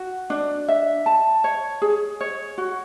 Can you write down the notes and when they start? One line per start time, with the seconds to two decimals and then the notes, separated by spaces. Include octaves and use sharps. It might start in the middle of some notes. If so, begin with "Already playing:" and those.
Already playing: F#4
0.30 D4
0.68 E5
1.06 A5
1.44 C#5
1.82 G#4
2.21 C#5
2.58 F#4